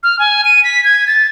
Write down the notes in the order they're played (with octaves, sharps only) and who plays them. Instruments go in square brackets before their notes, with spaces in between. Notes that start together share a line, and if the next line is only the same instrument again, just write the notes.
[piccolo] F6
G#5
D#7
B6
G#6
A6